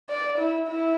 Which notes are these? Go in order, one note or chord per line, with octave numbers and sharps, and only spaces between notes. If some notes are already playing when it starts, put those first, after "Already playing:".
D5
E4
E4